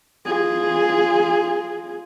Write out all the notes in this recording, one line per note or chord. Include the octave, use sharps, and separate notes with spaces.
F4 G#4